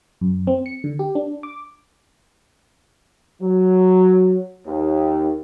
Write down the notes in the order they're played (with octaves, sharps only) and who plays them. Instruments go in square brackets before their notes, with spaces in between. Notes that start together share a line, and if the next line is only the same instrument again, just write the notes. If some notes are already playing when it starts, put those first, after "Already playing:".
[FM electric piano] F#2
C4
C#7
D3
G4
D4
D6
[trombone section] F#3
D#2